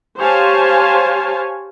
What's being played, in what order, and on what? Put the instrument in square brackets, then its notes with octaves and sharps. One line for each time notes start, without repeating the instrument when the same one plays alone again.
[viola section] G4 C5 C#5 F5 G#5 A5